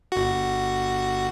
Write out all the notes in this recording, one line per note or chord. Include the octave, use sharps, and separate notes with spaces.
G1 F#4